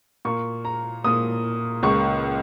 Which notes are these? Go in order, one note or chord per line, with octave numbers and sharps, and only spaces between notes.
A#2 A#3 C#6
A#5
A#2 A#3 D#6
C#2 C#3 A#3 C#6